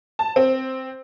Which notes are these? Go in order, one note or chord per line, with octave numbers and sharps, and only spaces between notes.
A5
C4